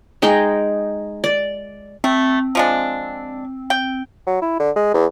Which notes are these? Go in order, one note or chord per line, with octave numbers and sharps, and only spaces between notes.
G#3 D#4 G#4 G5
D5
A3 C4
F3 G#3 D4
G5
F#3
E4
D3
G#3
E2